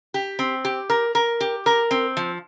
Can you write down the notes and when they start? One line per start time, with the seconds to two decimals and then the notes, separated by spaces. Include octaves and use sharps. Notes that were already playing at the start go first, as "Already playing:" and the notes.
0.14 G4
0.39 C4
0.65 G4
0.90 A#4
1.15 A#4
1.41 G4
1.66 A#4
1.91 C4
2.17 F3